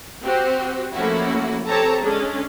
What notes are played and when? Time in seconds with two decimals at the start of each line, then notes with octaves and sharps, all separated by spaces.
0.23 C4 F#4 G4 C5
0.94 F3 A3 A#3 C#4 E4 F#4
1.67 C4 G4 A4 C#5 A5 A#5
2.02 D3 G#3 C#4 D4